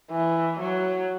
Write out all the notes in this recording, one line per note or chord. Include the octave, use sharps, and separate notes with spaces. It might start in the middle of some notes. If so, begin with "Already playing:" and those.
E3
F#3